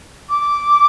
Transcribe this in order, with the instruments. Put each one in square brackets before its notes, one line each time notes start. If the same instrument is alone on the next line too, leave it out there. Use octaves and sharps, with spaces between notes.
[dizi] D6